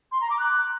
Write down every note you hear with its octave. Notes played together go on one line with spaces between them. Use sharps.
C6
A#5
D6
F#6